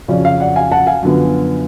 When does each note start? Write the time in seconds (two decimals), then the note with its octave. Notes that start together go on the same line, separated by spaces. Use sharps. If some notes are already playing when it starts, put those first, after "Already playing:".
0.08 F2 C#3 F#3 C#4 D5
0.25 F5
0.40 D5 F#5
0.56 F5 G#5
0.72 F#5 A5
0.87 F5 G#5
1.03 F#2 D3 F3 B3